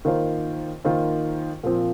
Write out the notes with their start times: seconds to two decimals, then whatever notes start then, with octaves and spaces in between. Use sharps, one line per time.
0.05 D#3 A#3 F4 C5
0.85 D#3 A#3 F4 C5
1.63 A#2 F3 C4 F4